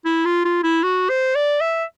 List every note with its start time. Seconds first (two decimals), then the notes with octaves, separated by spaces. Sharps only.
0.05 E4
0.26 F4
0.45 F4
0.64 E4
0.83 F#4
1.09 C5
1.35 D5
1.61 E5